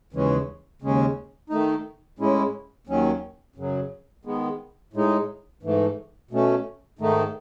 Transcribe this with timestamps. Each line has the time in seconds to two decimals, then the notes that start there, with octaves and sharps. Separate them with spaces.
0.13 D#2 C#3 E3 G#3 C#4
0.82 D#2 C#3 G#3 C#4
1.50 D#3 A3 D#4
2.19 A2 G#3 C#4 E4
2.87 D#2 D#3 F#3 C#4
3.56 F#2 C#3 F#3
4.25 D#3 G#3 B3
4.94 A2 G#3 D#4
5.63 G#2 E3 A3
6.31 B2 A3 C#4
6.99 G#2 D#3 A3 D#4